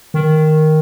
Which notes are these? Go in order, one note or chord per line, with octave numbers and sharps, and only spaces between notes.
D#3